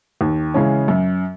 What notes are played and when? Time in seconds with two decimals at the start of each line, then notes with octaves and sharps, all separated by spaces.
0.21 D#2
0.54 C#3 E3 G#3 C#4
0.88 F#2